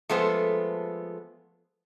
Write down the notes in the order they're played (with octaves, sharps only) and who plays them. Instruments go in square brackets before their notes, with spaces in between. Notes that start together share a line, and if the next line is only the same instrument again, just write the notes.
[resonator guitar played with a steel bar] F3 G#3 A3 B3 A4 C5